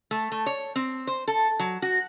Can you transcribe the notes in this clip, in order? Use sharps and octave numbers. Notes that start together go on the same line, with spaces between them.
A3
A3
C#5
C4
C5
A4
F#3
F#4